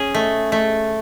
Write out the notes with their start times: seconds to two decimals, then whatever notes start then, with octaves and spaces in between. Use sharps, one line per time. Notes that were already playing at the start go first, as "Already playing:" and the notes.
Already playing: C#4 G#4
0.14 A3
0.52 A3